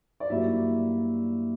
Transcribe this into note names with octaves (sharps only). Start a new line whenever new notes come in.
D5
G2 F#3 A#3 E4 E5